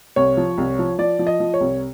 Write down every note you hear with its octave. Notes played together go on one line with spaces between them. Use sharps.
C2 C#5
F3
C2
F3
F3 D5
F3
D#5
F3
C#5
C2